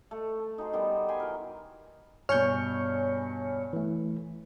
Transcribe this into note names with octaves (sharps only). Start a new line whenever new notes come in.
A3
A4
D#4 F#4 G#4 C5
D#3 G3 B3
G5 G#5 B5 C6
E3 F#3 A#4
G2 B2 C#5 G#5 F6 G6 C#7
E3 A3